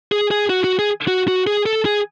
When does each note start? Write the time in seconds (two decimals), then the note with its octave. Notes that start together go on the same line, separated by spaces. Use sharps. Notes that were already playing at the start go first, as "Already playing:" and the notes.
0.12 G#4
0.31 G#4
0.50 F#4
0.64 F#4
0.79 G#4
1.08 F#4
1.28 F#4
1.47 G#4
1.66 A4
1.85 G#4